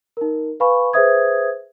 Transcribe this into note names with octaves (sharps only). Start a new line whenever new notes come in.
D#4 A#4
B4 F5 G#5 B5 C#6
G#4 B4 C5 E5 D#6 G#6